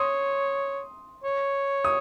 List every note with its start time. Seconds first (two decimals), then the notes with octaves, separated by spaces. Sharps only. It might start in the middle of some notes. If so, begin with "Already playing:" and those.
Already playing: C#5 C6 D#6
1.24 C#5
1.85 D#6